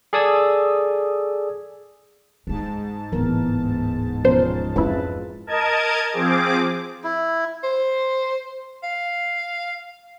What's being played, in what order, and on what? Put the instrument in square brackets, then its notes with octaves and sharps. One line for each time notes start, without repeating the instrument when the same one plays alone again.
[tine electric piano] G#4 A4 D5 D#6 E6 G#6
[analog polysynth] G#2 A5 [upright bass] G#3 D#4
[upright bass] D1 B3 [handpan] E3 A#4
[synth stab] B2 C5 [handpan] F3 C#4 A#4
[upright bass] F2 C4 [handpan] G#3 F4 B4 [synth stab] C#4 E4
[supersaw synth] A#4 D#5 A5 G#6
F3 C4 G#4 D6
[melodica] E4
[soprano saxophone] C5
F5